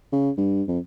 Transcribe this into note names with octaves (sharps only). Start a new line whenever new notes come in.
C#3
G2
F2